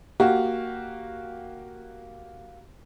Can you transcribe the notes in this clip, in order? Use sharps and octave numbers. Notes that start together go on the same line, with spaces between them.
A#3 F#4 G4